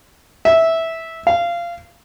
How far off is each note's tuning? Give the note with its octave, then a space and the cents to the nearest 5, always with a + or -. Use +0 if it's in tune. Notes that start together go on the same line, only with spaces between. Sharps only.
E5 -10
F5 -20